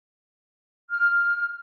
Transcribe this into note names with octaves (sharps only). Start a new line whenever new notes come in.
F6